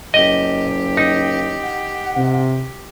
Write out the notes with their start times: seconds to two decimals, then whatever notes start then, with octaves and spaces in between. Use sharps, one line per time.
0.14 F#1 G4 D#5
0.97 D#4
1.63 F#5
2.17 C3